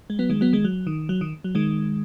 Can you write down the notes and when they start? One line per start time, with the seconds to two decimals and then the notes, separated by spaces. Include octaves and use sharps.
0.10 G#3
0.19 F#3 B3
0.29 D#3 G#3
0.41 F#3 B3
0.53 D#3 G#3
0.64 F#3
0.87 D#3
1.09 F#3
1.21 D#3
1.44 F#3
1.55 D#3 G#3